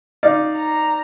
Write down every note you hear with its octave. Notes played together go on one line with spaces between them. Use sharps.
D#4 D5 F5
A#5